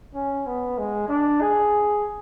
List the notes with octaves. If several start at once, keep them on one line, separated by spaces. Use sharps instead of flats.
C#4
B3
G#3
D4
G#4